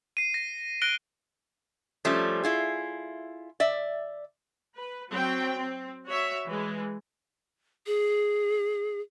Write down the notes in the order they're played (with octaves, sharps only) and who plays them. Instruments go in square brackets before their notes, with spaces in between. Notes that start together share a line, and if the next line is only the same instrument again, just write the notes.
[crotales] C7 D#7
A#6
F#6 A#6 D7 G7
[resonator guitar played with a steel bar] F3 G3 A3 C#4
E4 F4 G#4
D5 E5
[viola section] B4
F#3 C4 G5
C4
F#4 C#5 E5
E3 G#3
[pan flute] G#4